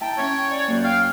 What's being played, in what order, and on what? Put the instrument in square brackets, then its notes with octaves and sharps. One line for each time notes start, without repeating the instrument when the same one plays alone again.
[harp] E4 A5 A#5 [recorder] G5
[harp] C#4 E4 [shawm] C#5
[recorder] D5
[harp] F#2 A#3
[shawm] F5 [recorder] G5